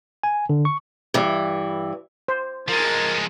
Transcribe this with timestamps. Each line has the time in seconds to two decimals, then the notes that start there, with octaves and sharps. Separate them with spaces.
0.23 G#5
0.49 D3
0.65 C#6
1.14 G2 E3
2.28 C5
2.68 F3 G#3 A#4 A6